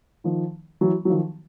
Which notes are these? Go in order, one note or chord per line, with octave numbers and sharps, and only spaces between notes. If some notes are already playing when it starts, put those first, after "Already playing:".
D#3 F3
E3 F#3
F#3
D#3 F3